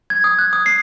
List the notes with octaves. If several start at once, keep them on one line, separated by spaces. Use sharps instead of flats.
G#6
D#6
F#6
D#6
C7